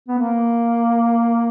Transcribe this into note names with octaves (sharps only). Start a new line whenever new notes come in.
B3
A#3